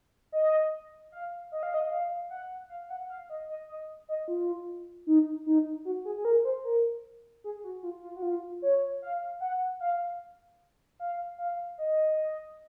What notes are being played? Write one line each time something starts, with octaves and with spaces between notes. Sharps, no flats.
D#5
F5
D#5
F5
D#5
F5
F#5
F5
F#5
F5
D#5
D#5
D#5
D#5
F4
D#4
D#4
F#4
G#4
G#4
A#4
C5
A#4
G#4
F#4
F4
F4
F#4
F4
C#5
F5
F#5
F5
F5
F5
D#5